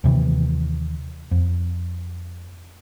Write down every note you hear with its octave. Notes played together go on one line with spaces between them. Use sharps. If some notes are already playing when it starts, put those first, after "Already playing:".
D#2 C3 E3
F2